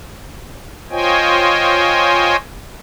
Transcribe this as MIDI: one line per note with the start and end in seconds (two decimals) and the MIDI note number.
0.91 2.36 65
0.91 2.36 72
0.91 2.36 73
0.91 2.36 75
0.91 2.36 79
0.91 2.36 80